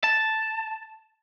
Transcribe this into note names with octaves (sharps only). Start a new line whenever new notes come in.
A5